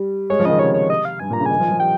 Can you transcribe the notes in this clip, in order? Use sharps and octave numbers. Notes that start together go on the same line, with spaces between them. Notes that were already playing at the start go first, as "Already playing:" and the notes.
Already playing: G3
G#3 C#5
F3
C#3 D#3 D#5
C3 C#5
C#5
D#5
F5
G2 G#5
A#2 A#5
C#3
D#3 G#5
F3
F3
G3 G5